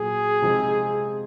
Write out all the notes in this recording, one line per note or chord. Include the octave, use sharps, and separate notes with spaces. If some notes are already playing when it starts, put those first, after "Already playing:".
Already playing: A#2 F#3 G#4
C3 F3 G#3 C4 D#4